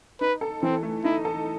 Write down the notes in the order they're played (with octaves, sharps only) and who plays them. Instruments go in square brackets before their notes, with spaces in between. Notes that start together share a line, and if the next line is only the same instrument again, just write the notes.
[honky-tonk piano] D#4 [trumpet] B4
[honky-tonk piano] A4
[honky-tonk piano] E3 [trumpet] C4
[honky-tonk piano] A3
[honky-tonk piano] D#4 [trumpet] E4
[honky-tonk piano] A4